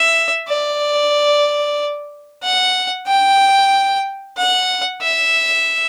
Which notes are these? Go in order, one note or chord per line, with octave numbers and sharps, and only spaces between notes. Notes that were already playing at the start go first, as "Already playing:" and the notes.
Already playing: E5
D5
F#5
G5
F#5
E5